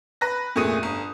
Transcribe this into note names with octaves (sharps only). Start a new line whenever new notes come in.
B4 F#6 A#6
F2 A#2 A3 G#4 D#6 D#7
G1